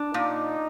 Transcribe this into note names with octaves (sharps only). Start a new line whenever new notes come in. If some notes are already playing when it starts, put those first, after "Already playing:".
Already playing: D4
A#2 D#4